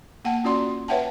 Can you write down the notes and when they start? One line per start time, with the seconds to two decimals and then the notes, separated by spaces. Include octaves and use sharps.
0.25 A#3 F#5 G5 A5
0.44 C#4 F4 F#4 D5 C6
0.88 B4 C#5 E5 F#5 G5 A5